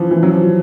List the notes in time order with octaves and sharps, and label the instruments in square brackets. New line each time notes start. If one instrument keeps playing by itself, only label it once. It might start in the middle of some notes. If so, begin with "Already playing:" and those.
Already playing: [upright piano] E3 F3
E3
F#3
F3